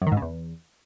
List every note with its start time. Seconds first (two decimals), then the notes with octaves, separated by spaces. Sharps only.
0.02 F#2
0.07 D#3
0.12 G#2
0.17 C#3
0.22 E2